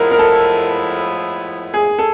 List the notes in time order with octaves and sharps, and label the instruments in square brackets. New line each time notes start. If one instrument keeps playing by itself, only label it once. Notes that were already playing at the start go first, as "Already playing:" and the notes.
Already playing: [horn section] A2 F3 G#3 B3 E4 [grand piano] A#4
[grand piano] A#4
A4
G#4
A4